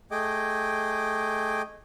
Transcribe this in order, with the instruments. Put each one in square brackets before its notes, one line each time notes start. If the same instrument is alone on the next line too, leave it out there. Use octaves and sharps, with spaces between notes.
[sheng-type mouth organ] A3 G#4 D#5 G5 D6